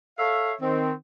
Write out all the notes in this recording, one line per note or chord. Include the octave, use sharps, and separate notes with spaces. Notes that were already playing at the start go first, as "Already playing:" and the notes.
A4 C#5 E5 F5
D#3 C4